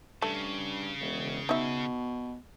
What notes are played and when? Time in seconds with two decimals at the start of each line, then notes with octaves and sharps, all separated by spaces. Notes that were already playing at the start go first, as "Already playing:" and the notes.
0.22 G2 C#3 A3
1.01 E1
1.49 B2 D#4 E5